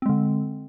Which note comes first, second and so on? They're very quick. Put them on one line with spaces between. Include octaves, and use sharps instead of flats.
C4 G#3 D3